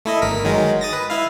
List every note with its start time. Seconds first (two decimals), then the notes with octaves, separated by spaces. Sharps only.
0.05 A3 E4 D#5
0.22 G1 A#4 B6
0.44 D#3 F#3 G#3
0.81 D#6 A6 A#6
0.93 B4
1.10 E4 F5